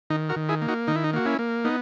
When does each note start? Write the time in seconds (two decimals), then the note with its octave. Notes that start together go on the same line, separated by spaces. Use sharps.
0.10 D#3 D#4
0.29 F#4 A#4
0.36 D#3
0.49 E4 G#4
0.62 A#3
0.68 D#4 F#4
0.87 D#3 D#4
0.96 E4
1.04 D#4
1.13 A#3 F#4
1.26 C#4 E4
1.39 A#3
1.65 B3 D#4